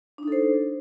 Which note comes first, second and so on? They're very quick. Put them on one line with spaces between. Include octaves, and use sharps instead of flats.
D4 D#4 A4 C5